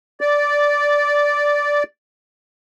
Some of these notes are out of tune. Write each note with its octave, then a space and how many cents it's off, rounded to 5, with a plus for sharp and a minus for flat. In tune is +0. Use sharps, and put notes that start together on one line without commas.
D5 -10